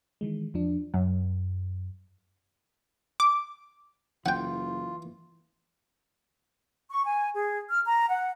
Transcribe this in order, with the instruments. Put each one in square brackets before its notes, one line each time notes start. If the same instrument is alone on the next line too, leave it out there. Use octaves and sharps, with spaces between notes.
[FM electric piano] D#3 E3 G#3
E2 F3 D4
[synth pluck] F#2
[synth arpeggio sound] D6
[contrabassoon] F#1 [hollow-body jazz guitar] E3 [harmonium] F4 [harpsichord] F#5 G5
[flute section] C#6
G#5
G#4
F6
A#5
F#5